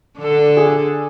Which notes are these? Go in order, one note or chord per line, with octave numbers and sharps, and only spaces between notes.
D3 D4 A4
G#4